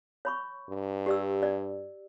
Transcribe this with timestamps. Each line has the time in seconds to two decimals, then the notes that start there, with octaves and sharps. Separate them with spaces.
0.25 C#5 B5 C#6
0.69 G2
1.06 G4 D5 E6
1.43 D5